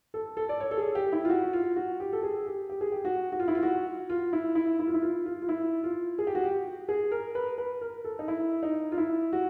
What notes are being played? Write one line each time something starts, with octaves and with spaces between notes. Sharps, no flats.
A4
A4
D5
C#5
A4
G#4
G4
E4
F4
F#4
F4
F#4
G4
A4
G#4
G4
G4
G#4
G4
F#4
F#4
F4
E4
F4
F#4
F4
E4
E4
E4
F4
E4
F4
F4
F4
E4
F4
G#4
G4
F#4
G4
G#4
A#4
B4
B4
A#4
A4
D#4
E4
D#4
F4
E4
F#4